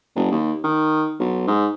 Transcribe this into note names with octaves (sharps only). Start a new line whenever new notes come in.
F#1
D#2
D#3
B1
G#2